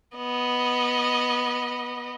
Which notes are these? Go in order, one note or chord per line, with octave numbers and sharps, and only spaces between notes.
B3 D#5